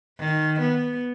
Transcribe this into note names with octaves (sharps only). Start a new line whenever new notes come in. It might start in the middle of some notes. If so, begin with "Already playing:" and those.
D#3
B3